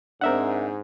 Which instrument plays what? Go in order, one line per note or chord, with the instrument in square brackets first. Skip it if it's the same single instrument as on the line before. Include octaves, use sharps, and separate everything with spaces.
[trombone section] G#2 [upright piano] C4 D4 [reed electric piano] A#4 E5 F#5